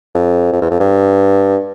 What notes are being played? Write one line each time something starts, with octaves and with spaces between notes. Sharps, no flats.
F2
F2
E2
F2
G2